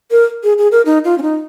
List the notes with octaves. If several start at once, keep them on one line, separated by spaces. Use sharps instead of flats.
A#4
G#4
G#4
A#4
D#4
F4
C#4
D#4